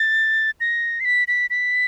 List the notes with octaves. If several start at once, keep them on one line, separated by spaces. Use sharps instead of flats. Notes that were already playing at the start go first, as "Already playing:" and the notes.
Already playing: A6
A#6
C7
B6
B6
B6